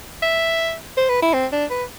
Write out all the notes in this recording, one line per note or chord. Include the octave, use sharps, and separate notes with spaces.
E5
C5
B4
E4
C4
D4
B4